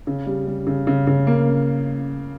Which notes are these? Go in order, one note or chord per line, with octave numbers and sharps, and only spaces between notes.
C#3
G3
G3
C#3
C#3
C#3
A#3